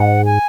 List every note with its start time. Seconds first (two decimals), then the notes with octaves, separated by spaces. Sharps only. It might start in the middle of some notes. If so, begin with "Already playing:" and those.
Already playing: G#2 F#5
0.25 G#5